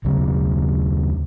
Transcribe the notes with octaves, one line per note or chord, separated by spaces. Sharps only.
D#2 C#3 F#3